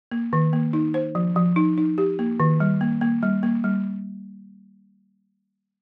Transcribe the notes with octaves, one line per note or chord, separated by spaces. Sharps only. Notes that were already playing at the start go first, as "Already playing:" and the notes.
A#3
D#3
A#3
D#4
C5
F3
F3
D#4
D#4
G4
A#3
D#3
G3
A#3
A#3
G3
A#3
G3